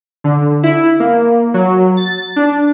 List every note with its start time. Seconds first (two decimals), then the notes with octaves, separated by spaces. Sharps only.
0.24 D3
0.63 E4
1.00 A#3
1.54 F#3
1.97 A6
2.36 D4